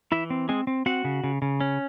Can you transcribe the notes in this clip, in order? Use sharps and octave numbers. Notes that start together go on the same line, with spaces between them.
E3 E4 E5
C4
G#3 C4 G#4
C4
C4 F#4 F#5
C#3
C#3
C#3
C#4